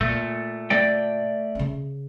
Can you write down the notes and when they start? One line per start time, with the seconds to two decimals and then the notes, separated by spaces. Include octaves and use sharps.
0.01 A#2 A3
0.70 A3 D5 G5
1.55 C#3 C#4